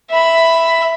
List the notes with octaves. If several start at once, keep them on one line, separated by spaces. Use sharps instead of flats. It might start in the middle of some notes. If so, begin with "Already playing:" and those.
E5 B5